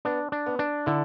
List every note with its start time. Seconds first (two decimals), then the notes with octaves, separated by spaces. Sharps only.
0.05 B3 D4
0.32 D4
0.46 B3
0.59 D4
0.86 D3 E4 A4